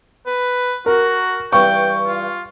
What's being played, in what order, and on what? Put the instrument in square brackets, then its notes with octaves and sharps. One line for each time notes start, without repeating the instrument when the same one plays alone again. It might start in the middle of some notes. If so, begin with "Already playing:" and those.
[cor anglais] B4
[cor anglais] F#4 [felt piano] A#4
[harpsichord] G2 E3 [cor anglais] G5 [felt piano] C#6
[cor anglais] F4